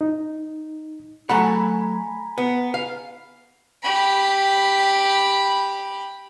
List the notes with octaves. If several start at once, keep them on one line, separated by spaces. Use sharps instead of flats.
D#4
F#3 A3 F#5 G#5 A#5 B5
B3
F5
G4 B5